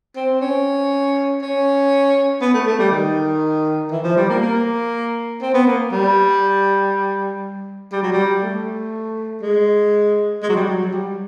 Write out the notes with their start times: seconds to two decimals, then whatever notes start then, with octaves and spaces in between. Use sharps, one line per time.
0.16 C4
0.41 C#4
1.42 C#4
2.41 B3
2.53 A3
2.66 A3
2.79 G3
2.91 D#3
3.91 E3
4.04 F3
4.17 G3
4.29 A#3
4.42 A#3
5.41 C4
5.54 B3
5.67 A#3
5.92 G3
7.92 G3
8.03 F#3
8.12 G3
8.42 A3
9.42 G#3
10.42 G#3
10.49 F#3
10.55 G3
10.67 F#3
10.80 F#3
10.92 G3